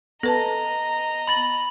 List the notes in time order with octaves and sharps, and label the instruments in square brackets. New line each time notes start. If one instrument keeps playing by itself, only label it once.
[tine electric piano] B3 [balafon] A4 B4 A5 [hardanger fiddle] D#5 A#5 [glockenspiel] A#6
[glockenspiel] B5 A6 F#7